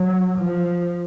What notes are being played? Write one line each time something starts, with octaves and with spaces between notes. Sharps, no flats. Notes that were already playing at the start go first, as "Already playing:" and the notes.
Already playing: F#3
F3